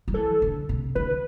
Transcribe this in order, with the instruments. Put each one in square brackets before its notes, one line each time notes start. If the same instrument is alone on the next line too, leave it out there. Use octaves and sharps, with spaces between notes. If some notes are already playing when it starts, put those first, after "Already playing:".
[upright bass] F#3
[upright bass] E3 [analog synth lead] A4
[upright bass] D3
C3
[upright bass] D3 [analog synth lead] B4